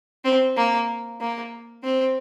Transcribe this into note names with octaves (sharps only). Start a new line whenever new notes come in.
C4
A#3
A#3
C4